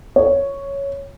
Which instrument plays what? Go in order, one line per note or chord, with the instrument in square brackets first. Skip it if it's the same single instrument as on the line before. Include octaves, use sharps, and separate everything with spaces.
[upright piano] C#5